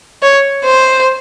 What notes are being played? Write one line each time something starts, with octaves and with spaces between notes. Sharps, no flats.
C#5
C5